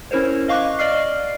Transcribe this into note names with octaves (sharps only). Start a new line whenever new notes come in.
C#4 E4 A#4 C5 C#5
D#5 F5 C#6 D6 F#6
D5 D#5 F6 C7